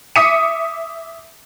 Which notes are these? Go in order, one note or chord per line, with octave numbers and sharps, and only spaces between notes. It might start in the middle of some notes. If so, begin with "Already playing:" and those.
E5 D6 D#6 B6 C#7 D#7